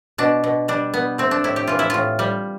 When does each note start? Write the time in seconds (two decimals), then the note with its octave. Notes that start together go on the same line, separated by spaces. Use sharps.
0.18 B2 D4
0.44 B2
0.68 G3 D4
0.94 G3 B3
1.18 A3 C4
1.31 D4
1.44 A2 E4
1.56 G4
1.67 E3 F4
1.79 E4
1.90 A2 F4
2.19 G3